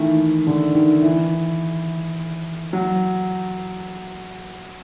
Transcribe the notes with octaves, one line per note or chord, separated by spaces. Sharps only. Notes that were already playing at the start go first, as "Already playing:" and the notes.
Already playing: D#3 E3 A3
D3
D#3
E3
F#3